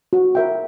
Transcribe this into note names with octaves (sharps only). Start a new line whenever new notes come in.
F#4
A#4 E5 G5